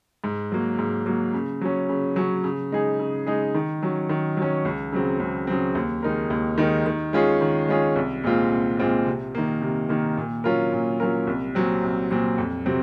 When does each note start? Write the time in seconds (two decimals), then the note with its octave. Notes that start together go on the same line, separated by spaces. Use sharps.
0.24 G#2
0.52 F#3 A#3
0.79 G#2
1.06 F#3 A#3
1.34 C#3
1.61 F#3 C#4
1.89 C#3
2.16 F#3 C#4
2.44 C#3
2.72 G#3 D#4 G#4
2.99 C#3
3.26 G#3 D#4 G#4
3.55 D#3
3.83 F#3 C#4
4.09 D#3
4.37 F#3 C#4
4.65 C#2
4.92 C#3 F#3 C4
5.20 C#2
5.47 C#3 F#3 C4
5.75 D#2
6.03 D#3 G#3 D#4 A#4
6.30 D#2
6.58 D#3 G#3 D#4 A#4
6.86 D#3
7.13 G#3 C#4 F4 G#4
7.41 D#3
7.68 G#3 C#4 F4 G#4
7.96 C2
8.24 A#2 G#3 C4 F4
8.51 C2
8.79 A#2 G#3 C4 F4
9.06 C3
9.35 D#3 A#3
9.62 C3
9.89 D#3 A#3
10.17 A#2
10.44 F#3 C#4 F4 A#4
10.72 A#2
11.00 F#3 C#4 F4 A#4
11.27 C2
11.55 A#2 F#3 C4
11.83 C2
12.11 A#2 F#3 C4
12.38 F2
12.65 C3 F#3 C4